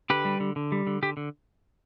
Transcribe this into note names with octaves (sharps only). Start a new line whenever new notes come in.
D3 G4 B4
G3
D3
D3
G3
D3
D3 G4
D3